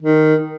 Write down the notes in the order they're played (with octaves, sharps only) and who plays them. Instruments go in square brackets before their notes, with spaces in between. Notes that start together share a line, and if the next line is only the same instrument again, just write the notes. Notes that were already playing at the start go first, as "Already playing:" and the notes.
[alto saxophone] D#3